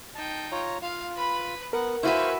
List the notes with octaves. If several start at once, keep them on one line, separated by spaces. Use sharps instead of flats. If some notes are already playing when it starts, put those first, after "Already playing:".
D#4 G5 A5
F4 C#5 A#5
F4 F5
B4 B5
B3 A#4 F#5
E4 F#4 B4 C5 E5 F5 G#5 C#6